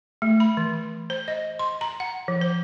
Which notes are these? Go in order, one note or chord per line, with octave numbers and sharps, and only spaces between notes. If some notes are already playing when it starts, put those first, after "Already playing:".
A3
B5
E3
C5
D#5
C6
A#5
F#5
F3
C5